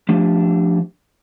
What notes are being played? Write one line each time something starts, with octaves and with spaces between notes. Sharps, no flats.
F3 A3 D4 G4